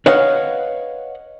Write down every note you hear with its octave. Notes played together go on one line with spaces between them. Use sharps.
B4 C#5 D#5 F5 F#5